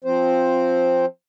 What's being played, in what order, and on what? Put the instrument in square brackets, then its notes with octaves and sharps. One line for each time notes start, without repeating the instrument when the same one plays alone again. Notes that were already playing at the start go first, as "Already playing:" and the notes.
[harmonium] F3 C4 C5